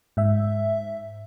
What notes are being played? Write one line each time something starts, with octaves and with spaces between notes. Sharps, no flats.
G#2 E5